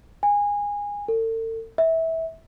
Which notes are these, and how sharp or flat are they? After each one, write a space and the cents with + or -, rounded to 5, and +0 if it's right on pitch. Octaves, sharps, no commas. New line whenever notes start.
G#5 -20
A4 +40
E5 -20